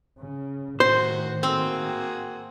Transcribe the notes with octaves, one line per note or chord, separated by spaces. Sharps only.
C#3
F#2 A2 D#3 F#4 C5 C6
A#3 C4 F#4 G#4